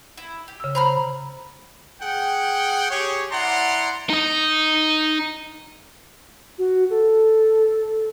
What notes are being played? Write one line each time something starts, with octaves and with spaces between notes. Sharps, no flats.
E4
G4
C#3 E6
C5 A#5 B5 F6
G#4 F#5 G5
G4 G#4 C#5
E4 D5 F#5 A#5 C6
D#4 D#5
F#4
A4